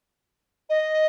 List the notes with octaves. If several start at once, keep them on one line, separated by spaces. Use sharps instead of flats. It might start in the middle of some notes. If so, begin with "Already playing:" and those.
D#5